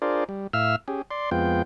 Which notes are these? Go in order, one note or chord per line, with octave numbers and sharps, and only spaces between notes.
D4 F4 G#4 A#4 C5 D5
G3
A2 E5 F5 E6 F6
C#4 G4 G#4
D5 C6
F2 G#3 B3 F4 G5